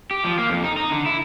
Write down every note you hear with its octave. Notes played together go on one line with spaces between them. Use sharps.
G4
F3
A#3
F2
D#4
D#4
D3
E4